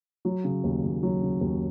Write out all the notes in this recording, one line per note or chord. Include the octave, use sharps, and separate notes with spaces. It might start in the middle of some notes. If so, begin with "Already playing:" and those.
F#3
C#3
D#2
D#2
F#3
C#3
D#2